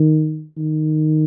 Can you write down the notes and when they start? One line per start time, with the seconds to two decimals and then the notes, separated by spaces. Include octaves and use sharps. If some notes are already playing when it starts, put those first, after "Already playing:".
Already playing: D#3
0.58 D#3